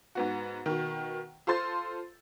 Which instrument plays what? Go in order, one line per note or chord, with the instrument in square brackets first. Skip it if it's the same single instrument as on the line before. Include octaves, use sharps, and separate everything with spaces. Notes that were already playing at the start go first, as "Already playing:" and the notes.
[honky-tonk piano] G#2 B3 F#4
B2 D#3
F4 A4 C5 C6 A6